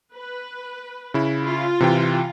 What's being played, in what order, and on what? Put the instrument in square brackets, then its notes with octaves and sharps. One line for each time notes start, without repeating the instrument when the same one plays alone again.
[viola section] B4
[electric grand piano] C#3 E4
[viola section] F4
[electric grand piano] C3 E3 G5